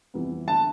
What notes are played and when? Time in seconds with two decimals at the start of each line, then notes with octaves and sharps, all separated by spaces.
0.14 F2 C3 E3 G3 B3
0.48 D3 A3 A5